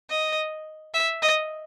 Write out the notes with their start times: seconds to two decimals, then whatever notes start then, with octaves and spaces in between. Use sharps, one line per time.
0.10 D#5
0.94 E5
1.22 D#5